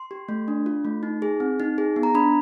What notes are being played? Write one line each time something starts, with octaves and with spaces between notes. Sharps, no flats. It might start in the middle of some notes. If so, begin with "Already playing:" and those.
Already playing: C6
G4
A3
D4
F4
A3
D#4
G#4
C4
D#4
G#4
B3
A#5
D4 B5